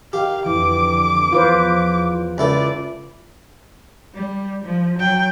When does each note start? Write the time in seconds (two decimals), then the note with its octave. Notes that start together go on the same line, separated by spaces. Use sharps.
0.13 D#3 G4 F5
0.46 F2 D3 E3 D6
1.32 E2 F3 F4 B4 C5
2.38 C#2 E4 A4 D5
4.15 G3
4.65 F3
4.99 F#3 G5